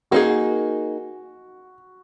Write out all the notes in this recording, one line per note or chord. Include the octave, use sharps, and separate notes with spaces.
A#3 D#4 F#4 G#4